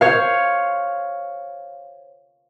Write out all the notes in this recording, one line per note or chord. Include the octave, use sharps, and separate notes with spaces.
C5 C#5 F5